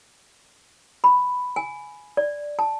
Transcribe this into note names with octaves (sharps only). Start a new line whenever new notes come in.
B5
G#5
D5
A5